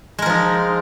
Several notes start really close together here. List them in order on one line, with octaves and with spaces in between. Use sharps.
G#3 A#4 F3 D#4